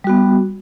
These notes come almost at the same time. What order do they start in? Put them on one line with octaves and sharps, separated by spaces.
G3 F#4 B3